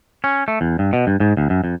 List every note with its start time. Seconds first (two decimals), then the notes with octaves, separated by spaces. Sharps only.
0.24 C#4
0.48 A3
0.61 E2
0.79 G2
0.93 B2
1.07 G2
1.20 G#2
1.37 D2
1.50 F#2
1.64 F2